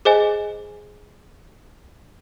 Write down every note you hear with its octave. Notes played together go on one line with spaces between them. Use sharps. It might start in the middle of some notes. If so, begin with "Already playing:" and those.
G#4 C5 D#5 G#5